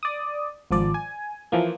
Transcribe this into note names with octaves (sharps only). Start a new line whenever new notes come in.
D5 D#6
G#1 F3 D5
G#5
E3 F3 A#3